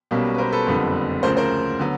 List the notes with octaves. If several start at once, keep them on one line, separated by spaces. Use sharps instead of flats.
B1 B2 G3 A#3 C#4
B4
A#4 C5
A4 B4
F#1 F2 D3 G3 B3
D2 C#3 F3 A#4 C5
A#4 C5
D3 F#3 B3